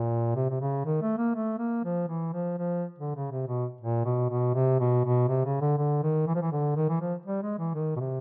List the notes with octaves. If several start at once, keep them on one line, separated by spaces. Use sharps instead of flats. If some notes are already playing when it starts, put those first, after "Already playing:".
Already playing: A#2
C3
C3
C#3
D#3
A3
A#3
A3
A#3
F3
E3
F3
F3
D3
C#3
C3
B2
A#2
B2
B2
C3
B2
B2
C3
C#3
D3
D3
D#3
E3
F3
E3
D3
D#3
E3
F3
G3
G#3
E3
D#3
B2
C3